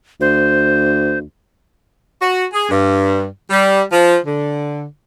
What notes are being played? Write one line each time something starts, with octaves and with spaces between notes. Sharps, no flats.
D2 C5
F#4
G#4
G2
G3
F3
D3